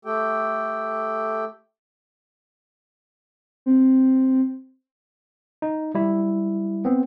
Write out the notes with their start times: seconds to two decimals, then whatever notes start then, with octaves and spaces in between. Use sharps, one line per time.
0.05 A3 G4 A4 G5
3.66 C4
5.62 D#4
5.95 G3 E4
6.85 B3 C4